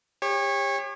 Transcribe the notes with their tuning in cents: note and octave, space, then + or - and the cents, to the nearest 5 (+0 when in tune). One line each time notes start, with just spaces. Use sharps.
G4 +35 C#5 -20